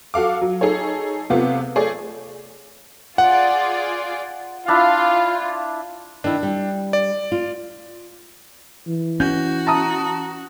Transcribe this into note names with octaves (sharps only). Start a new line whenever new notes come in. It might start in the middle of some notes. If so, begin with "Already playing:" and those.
F#4 A4 F5 D6
F#3
D#4 G#4 A4 C#5
C3 A3 B3 F4
A3 G#4 C#5 D5
F4 G#4 D5 F#5
D4 E4 F4 F5
D#3 D4 E4
G3
D5
F4
E3
C#4 F#4 G6
A5 A#5 D#6